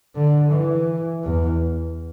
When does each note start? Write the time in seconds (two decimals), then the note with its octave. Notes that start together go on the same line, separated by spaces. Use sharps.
0.15 D3
0.52 E3
1.24 E2